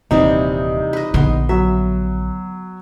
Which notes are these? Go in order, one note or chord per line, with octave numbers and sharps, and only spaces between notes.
D#1 C3 E3 G3 D#4
B4 D#5
A#1 D3 B3 C6
F#3 E5